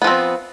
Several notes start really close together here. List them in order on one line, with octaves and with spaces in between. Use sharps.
B3 F3 C4